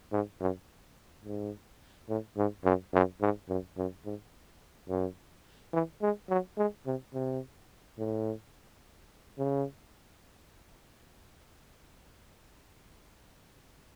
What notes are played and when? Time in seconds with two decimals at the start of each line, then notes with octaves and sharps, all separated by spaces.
0.12 G#2
0.41 F#2
1.25 G#2
2.09 A2
2.37 G#2
2.64 F#2
2.94 F#2
3.21 G#2
3.49 F#2
3.78 F#2
4.05 G#2
4.89 F#2
5.73 E3
6.02 G#3
6.30 F#3
6.57 G#3
6.86 C3
7.14 C3
7.98 A2
9.38 C#3